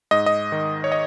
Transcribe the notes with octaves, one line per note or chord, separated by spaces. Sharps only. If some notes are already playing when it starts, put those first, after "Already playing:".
G#2 D#5
D#5
D#3
C#5
D#5